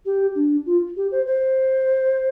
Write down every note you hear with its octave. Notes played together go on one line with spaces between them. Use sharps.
G4
D4
F4
G4
C5
C5